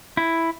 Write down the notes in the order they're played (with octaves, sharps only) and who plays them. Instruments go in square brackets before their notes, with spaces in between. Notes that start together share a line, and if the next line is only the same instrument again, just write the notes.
[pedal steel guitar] E4